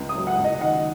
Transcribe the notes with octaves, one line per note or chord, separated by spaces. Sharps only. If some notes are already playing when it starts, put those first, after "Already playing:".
Already playing: C#2
D#6
F#3
F#5
C#2
D#5
D#3 F#5